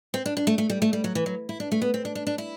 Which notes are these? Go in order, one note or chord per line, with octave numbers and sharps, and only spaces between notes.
C4
D4
D4
A3
A3
G3
A3
G3
F#3
E3
F#3
E4
D4
A3
B3
C4
D4
D4
D4
E4